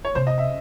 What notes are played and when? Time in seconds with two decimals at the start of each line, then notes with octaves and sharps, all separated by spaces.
0.05 C#5
0.15 C3 C5
0.27 D#5
0.38 E5